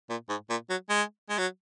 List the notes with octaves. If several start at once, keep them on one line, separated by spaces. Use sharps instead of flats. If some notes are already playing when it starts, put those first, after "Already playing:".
A#2
G#2
A#2
F#3
G#3
G#3
F#3